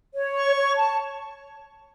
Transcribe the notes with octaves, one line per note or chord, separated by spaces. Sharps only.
C#5
C#6
C#5
A5